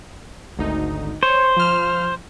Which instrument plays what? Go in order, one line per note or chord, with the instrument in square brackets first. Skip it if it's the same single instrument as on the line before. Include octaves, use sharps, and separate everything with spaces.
[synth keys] G#1 D2 D#4
[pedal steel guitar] C5 [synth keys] C#5
[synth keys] F3 F6